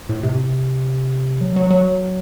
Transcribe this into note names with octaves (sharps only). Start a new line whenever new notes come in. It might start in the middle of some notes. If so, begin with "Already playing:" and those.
A2
C3
F#3
F#3
F#3